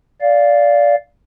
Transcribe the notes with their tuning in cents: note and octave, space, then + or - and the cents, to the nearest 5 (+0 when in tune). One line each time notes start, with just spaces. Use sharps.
D5 -15 F5 +0